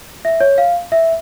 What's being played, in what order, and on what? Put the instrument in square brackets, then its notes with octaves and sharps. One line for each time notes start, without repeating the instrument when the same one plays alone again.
[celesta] E5
C#5
F5
E5